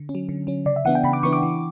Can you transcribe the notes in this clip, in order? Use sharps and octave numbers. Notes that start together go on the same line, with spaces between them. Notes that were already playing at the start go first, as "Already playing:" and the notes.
Already playing: D3
C#4
F#3
D3
F#3 C#4
C#3 D5
E5
E3 B3 D4 F#5
G5
C#3 B5
D6
E3 B3 D4 C#6
D6
E3